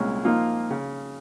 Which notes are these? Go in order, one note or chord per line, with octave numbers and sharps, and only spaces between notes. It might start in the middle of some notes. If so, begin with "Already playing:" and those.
Already playing: C2 A#2 G#3 C#4
A#2 F3 A#3 D#4 F4
C#3